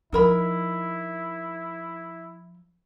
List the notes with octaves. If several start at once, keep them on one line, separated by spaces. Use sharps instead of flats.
F3 D#4 E4 A#4 B5